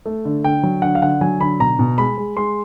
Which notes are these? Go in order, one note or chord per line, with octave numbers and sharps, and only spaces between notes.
A3
D3
D3 G5
F#3
D3 F#5
F5
D3 F#5
F#3 G#5
D3 B5
B2 A#5
B2
G#3 B5
G#3
G#3 C6